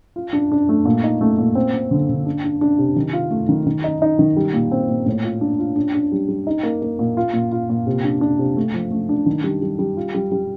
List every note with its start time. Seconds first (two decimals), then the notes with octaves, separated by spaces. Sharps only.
0.16 F4
0.33 D4
0.52 D4
0.69 A3
0.85 A#2
1.03 D#4
1.21 A3
1.38 A#2
1.55 C4
1.74 C4
1.91 D3
2.09 D3
2.26 D4
2.44 D4
2.61 D4
2.79 C3
2.96 D#3
3.13 F4
3.31 A3
3.49 D#3
3.67 D#3
3.84 D#4
4.02 D#4
4.19 D#3
4.37 G3
4.54 A#2
4.72 C4
4.89 A#2
5.06 A2
5.24 F4
5.41 D4
5.59 F4
5.76 D4
5.94 D4
6.12 G3
6.29 G3
6.47 D#4
6.63 A#3
6.82 A#3
6.99 A#2
7.17 F4
7.33 A#2
7.52 F4
7.69 A#2
7.87 C3
8.04 D4
8.21 D4
8.39 C3
8.57 A3
8.74 F3
8.91 A3
9.09 D4
9.26 D#3
9.44 G3
9.62 G3
9.79 G3
9.97 F4
10.14 G3
10.32 G3